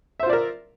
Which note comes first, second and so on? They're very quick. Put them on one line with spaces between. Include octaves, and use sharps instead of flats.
E5 C5 F4 D5 A#4